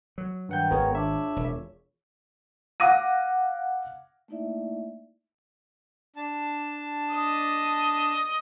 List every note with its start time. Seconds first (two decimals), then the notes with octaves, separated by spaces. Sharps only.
0.18 F#3
0.49 G2 D#3 F#5 G6
0.71 G#1 B3 F4 G#4 A#4 C#5
0.95 D4 E5
1.36 E1
2.80 F5 F#5 D6 A#6 D#7
4.28 A3 A#3 D#4 E4 D5 E5
6.16 D4 A5
7.14 D#5